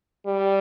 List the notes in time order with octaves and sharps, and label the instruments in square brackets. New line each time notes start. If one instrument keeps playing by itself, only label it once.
[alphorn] G3